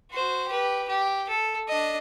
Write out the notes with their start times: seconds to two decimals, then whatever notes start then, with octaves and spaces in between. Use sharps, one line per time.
0.12 F#4 C5
0.48 G4 B4
0.88 G4
1.30 A4
1.69 D4 D#5